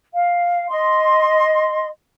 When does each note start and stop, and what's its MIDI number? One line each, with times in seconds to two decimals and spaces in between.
0.13 0.69 77
0.70 1.88 75
0.70 1.88 84